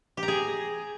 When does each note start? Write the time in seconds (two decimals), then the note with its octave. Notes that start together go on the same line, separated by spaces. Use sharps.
0.17 G4
0.23 A#5
0.28 G#4